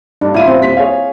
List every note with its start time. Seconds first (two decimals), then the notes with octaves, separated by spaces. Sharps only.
0.21 G2 D4
0.34 A1 E4 F4 D#7
0.48 C4
0.61 D#1 B6
0.77 G#4 C#5 F5